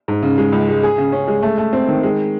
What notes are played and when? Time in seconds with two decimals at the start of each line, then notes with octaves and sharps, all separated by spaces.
0.08 G#2
0.23 C#3
0.38 G#3
0.52 C#2
0.68 G#3
0.83 G#4
0.98 C#3
1.12 C#4
1.27 G#3
1.42 A3
1.58 A3
1.73 C4
1.88 D#3
2.03 G#3